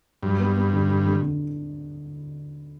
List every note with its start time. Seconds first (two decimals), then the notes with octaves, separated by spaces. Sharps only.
0.23 G2 F#3
0.39 B3
0.56 B3
0.73 D3
0.89 D3
1.06 D3
1.23 D3